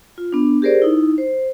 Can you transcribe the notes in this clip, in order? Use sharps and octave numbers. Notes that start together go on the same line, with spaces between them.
F4
B3 D4
G4 G#4 A#4 C5 D5
D#4 E4
C5